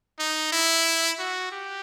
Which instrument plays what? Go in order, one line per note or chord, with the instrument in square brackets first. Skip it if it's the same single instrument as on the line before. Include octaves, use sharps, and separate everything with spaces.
[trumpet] D#4
E4
F#4
G4